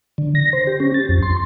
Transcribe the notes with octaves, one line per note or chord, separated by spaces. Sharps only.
D3
A#6
C5
G4
C#4
A6
F2
C6